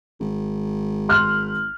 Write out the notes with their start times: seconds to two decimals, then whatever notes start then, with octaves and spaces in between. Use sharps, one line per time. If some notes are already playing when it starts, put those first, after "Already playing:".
0.20 G#1
1.09 C6 F6 F#6